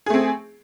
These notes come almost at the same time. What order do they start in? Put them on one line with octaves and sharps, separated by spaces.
G#4 A3 C4